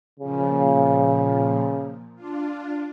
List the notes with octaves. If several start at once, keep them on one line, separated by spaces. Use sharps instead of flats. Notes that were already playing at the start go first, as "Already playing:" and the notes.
A#2 C#3 F3
D4 F4